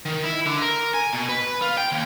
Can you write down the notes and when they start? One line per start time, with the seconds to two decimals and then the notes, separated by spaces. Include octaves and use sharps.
0.05 D#3
0.23 E4
0.46 D3
0.62 A#4
0.95 G#5
1.13 B2
1.29 B4
1.62 F4
1.78 G5
1.92 D#2